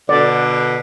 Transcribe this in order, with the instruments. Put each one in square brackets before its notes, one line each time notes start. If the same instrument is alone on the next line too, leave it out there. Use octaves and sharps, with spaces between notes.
[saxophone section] B2 D3 [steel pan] D5